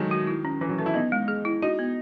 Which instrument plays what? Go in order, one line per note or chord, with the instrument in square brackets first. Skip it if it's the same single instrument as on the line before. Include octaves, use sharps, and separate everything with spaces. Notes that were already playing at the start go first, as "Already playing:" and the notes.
Already playing: [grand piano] D#3 F#3 G#3 A3
[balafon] F#4
E4
C#4
[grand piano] E3 [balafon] C#4
[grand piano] F#3
[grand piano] A3 [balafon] B4
[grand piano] E4
[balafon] B3 [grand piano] D#4
[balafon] G#3
G#4
E4
[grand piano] D#4 [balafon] F#4
[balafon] B3